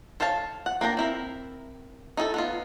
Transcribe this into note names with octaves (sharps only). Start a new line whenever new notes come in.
A4 C5 C#5 F5 A5
F#5
A#3 D4 G5 A#5
C4 E4 A#4
D#4 E4 G#4 A4
B3 D#4 F4